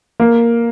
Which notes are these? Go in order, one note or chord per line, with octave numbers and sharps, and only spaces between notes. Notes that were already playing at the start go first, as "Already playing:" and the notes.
A#3